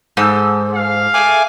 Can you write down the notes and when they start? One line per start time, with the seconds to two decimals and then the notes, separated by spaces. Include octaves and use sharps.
0.17 G#2 A4 E6 G6
0.75 F5
1.14 A3 G#4 G#5 D6